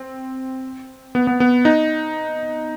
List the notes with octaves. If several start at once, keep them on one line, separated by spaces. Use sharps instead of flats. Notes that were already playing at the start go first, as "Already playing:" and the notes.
Already playing: C4
B3
B3
B3
D#4